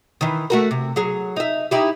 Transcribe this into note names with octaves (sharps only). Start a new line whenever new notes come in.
D#3 E3
A3 F#4 A#4
C3
F#3 G#4
D#4 E5
D#4 E4 G4